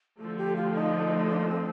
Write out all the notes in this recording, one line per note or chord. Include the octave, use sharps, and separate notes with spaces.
D3 F3 A3 A4
G4
F4
D#4
D4
A#3
C4